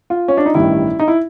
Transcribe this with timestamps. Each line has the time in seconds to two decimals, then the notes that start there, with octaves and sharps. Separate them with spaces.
0.10 F4
0.28 C#4
0.37 D4
0.46 D#4
0.54 A1 G2 D#3 E4
1.00 D#4
1.08 E4